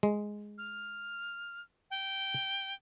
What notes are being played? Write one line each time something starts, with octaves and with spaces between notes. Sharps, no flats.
G#3
F6
G5